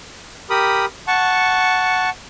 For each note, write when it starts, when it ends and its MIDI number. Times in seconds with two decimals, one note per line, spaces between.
0.50 0.85 67
0.50 0.85 70
0.50 0.85 83
0.50 0.85 87
1.07 2.10 78
1.07 2.10 81
1.07 2.10 85